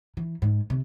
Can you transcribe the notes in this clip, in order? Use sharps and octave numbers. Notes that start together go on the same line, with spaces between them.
E3
G#2
C3